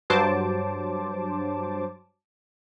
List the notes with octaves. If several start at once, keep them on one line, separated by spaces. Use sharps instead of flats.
G2 F#3 C5 A5 D6